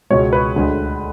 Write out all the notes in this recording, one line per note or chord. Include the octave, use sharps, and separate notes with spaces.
C#2 B2 G#3 C#5
B4
D2 D3 G#3